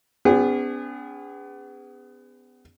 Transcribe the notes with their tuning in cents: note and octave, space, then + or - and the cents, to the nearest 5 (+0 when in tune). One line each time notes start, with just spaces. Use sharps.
B3 +30 D4 -45 G#4 -30